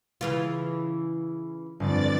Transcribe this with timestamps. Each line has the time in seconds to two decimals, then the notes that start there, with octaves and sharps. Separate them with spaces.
0.21 C#3 E3 F4
1.80 G1 F2 C4 D5 A6